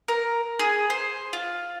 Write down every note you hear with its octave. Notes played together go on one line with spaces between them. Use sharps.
A#4
G#4
C5
F4